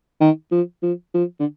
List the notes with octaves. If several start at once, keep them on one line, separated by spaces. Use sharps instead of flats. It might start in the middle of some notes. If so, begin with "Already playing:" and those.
D#3
F3
F3
F3
D3